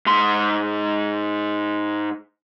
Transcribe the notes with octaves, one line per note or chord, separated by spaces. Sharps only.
G#2 C6